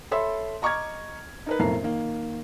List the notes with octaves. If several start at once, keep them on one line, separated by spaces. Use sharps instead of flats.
A4 C#5 E5 B5 C6 E6
D#5 A#5 C#6 D6 F6 G#6
D#4 A#4 B4
B1 F2 A2 A3 A#4 C7
D#3 A#3